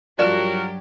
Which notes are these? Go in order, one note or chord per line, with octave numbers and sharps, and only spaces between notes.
G2 F3 F#3 F#4 G4 A#4 D5 E7